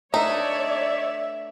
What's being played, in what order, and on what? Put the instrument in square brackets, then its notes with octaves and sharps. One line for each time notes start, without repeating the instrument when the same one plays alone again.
[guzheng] A3 D4 B4 [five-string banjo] D#4 [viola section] C#5 D5 [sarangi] E5